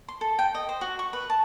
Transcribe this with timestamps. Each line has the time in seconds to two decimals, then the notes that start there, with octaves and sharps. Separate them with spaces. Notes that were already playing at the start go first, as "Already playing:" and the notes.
0.08 C6
0.21 A4
0.39 G5
0.55 D#5
0.69 C5
0.81 F#4
0.99 C#6
1.13 B4
1.30 A5